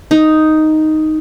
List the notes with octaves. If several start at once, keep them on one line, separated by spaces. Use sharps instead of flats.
D#4